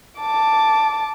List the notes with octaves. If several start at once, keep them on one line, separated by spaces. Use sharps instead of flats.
A5 D6